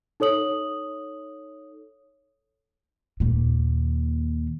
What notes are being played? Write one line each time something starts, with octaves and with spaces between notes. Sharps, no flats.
D#4 A4 C#5 D#6 F#7
D#2 A#2